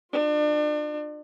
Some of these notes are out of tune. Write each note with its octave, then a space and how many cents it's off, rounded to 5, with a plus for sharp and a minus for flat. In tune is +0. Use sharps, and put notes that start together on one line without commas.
D4 +35 F4 +35